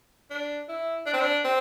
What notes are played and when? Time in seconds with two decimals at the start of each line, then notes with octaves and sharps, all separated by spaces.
0.30 D4
0.69 E4
1.06 D4
1.13 C4
1.21 D4
1.44 C4